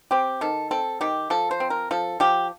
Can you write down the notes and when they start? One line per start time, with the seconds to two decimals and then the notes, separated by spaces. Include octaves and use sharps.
0.11 C4 G4
0.41 D#3 A4
0.71 C4 A4
1.01 D#3 G4
1.30 F3 A4
1.51 C5
1.60 C4
1.70 A#4
1.91 F3 A4
2.20 F3 G4